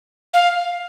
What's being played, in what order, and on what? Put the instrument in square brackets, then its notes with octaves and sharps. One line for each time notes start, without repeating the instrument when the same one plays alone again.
[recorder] F5